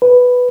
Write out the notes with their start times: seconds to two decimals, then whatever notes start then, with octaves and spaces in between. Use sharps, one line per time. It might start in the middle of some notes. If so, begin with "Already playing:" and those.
0.02 B4